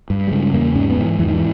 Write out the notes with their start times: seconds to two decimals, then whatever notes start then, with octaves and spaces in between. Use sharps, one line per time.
0.10 G2
0.28 G3
0.31 C#3 G#3
0.53 E2 A#3
0.75 G#2 C#4
0.90 B3
0.97 G#2 D#3
1.05 E3
1.19 E2 E3
1.28 D#3
1.36 E3